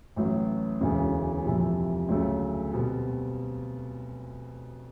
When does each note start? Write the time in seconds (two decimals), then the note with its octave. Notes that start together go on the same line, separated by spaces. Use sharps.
0.16 A1 A2 F#3
0.80 E1 D2 C#3 E3 G#3
1.45 F2 C3 E3
2.09 D2 C#3 F#3 A3
2.73 B2 G3 C4